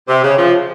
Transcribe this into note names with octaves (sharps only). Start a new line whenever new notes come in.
C3
C#3
F3